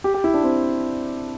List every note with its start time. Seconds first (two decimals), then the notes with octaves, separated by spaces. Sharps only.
0.04 G4
0.14 G4
0.24 E4
0.34 D4
0.43 C4